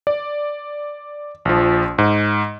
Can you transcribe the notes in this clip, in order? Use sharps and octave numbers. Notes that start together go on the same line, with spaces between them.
D5
A#1 F3
G#2